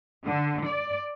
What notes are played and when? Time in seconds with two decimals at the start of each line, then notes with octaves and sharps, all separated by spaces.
0.25 D3
0.64 D5